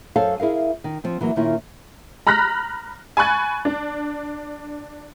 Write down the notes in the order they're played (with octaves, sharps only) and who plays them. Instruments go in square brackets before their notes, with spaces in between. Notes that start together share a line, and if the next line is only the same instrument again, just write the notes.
[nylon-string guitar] F#2 A4 C5 C#5 F5 A5
E4 G#4 A#4 F5
D#3
F3 C4
E3 F#3 A#3
A#2 D#3 A#3 C#4 E4 F4
[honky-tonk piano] A#5 B5 F6 F#6 A#6 B6
G#5 B5 C#6 F#6 A6
D4